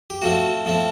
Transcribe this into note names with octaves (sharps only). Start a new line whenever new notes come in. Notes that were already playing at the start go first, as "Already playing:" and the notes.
G4
A2 F3 A3 C4 F#4
A2 F3 A3 C4